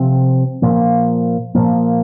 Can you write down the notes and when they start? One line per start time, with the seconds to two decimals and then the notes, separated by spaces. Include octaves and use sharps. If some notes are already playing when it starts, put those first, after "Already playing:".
Already playing: C3 F3 C4
0.62 A#2 F3 A#3
1.55 A#2 F3 A#3